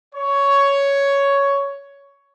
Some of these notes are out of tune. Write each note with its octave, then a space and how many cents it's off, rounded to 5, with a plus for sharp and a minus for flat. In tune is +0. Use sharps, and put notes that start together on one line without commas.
C#5 +10